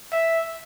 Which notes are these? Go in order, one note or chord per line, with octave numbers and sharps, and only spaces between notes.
E5